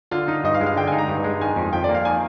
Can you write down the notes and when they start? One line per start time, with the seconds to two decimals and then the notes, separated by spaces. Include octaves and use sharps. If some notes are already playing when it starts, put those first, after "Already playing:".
0.11 D3 F4
0.28 D#4
0.44 G2 D#5
0.54 F5
0.61 G#3
0.66 F5
0.77 D3 G5
0.88 G#5
0.92 D#4
0.98 A#5
1.08 G2
1.24 G#3
1.41 D#3 G#5
1.56 F2
1.73 F2 G5
1.84 D5
1.89 A#3
1.95 F5
2.05 D#3 G#5